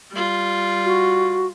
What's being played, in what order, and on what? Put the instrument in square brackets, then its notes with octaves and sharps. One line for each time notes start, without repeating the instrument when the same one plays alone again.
[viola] G3 F4
[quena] F#4